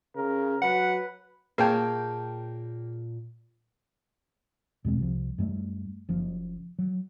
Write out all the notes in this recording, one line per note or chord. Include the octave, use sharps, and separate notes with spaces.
C#3 A#4
F#3 B4 F#5
A#2 A#3 G#4 C#5 G5 A5
E2 B2 G#3 C4
C2 C3 F3
F#2 G3 A3
F#1 F#2 F3
F#3